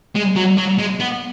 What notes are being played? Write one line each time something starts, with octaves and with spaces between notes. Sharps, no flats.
G#3
F#3
F#3
G#3
B3